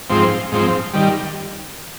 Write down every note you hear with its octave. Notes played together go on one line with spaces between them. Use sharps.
G#2 F3 C4
G#2 F3 C4
D#3 G3